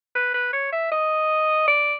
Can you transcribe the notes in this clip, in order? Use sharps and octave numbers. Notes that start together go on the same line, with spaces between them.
B4
B4
C#5
E5
D#5
D5